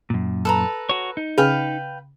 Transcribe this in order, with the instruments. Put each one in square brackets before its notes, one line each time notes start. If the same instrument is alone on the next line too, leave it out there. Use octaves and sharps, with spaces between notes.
[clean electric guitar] F#2 A#2
[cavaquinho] A4 B4 A#5
[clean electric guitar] F#4 C#5
D#4
[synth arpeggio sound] C#3 C#4 F6 [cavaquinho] B4 F5 G5